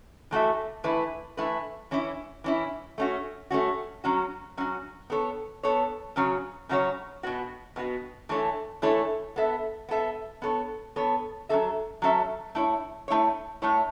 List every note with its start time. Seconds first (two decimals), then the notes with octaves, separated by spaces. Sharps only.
0.31 E3 A3 F#4 A4 E5
0.84 E3 A3 E4 B4
1.37 E3 A3 E4 B4
1.91 E3 C#4 E4
2.44 E3 C#4 E4
2.98 A3 C#4 F#4
3.51 A3 C#4 F#4
4.04 F#3 C#4 F#4
4.57 F#3 C#4 F#4
5.10 B3 A4 C#5
5.63 B3 A4 C#5
6.16 C#3 F#3 C#4 F#4 C#5
6.69 C#3 F#3 C#4 F#4 C#5
7.23 B2 B3 F#4
7.76 B2 B3 F#4
8.29 E3 A3 E4 A4 C#5
8.82 E3 A3 E4 A4 C#5
9.36 B3 A4 E5
9.89 B3 A4 E5
10.42 B3 A4 C#5
10.96 B3 A4 C#5
11.49 F#3 C#4 A4 E5
12.02 F#3 C#4 A4 E5
12.55 A3 E4 C#5
13.08 A3 E4 C#5
13.62 A2 A3 E4 C#5